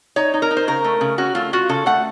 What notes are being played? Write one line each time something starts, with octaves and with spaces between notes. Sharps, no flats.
D#4 C#5
D#4
A#4
D#4
C5
C#3 A#4
A3
C#3
C#4 F#4
A3 F4
F4 F#4
C#3 A4
A3 F#5